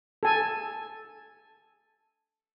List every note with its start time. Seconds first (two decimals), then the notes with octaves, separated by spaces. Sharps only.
0.23 A4 G#5